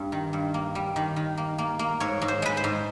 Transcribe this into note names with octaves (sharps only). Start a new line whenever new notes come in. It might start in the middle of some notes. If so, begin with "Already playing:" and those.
Already playing: G2 G3
D#3
G2
A#3
G3
D#3
D#3
A#3
A#3
A#3
G#2 C#5
G#2
C5
G#3 B4
C5
G#2